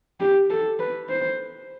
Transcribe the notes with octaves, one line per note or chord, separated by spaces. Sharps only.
G4
A4
B4
C5